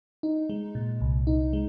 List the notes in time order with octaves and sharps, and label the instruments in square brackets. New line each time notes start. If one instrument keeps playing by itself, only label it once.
[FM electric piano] D#4
G#3
A#2
C2
D#4
G#3